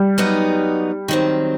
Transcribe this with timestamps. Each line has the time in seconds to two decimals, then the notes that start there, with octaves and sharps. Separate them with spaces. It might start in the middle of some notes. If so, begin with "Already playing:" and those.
Already playing: G3
0.18 F#3 B3 D#4
1.08 D#3 F#3 C4